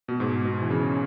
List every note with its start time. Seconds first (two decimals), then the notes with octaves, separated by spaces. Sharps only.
0.08 B2
0.20 G#2
0.45 B2
0.62 E3
0.70 C#3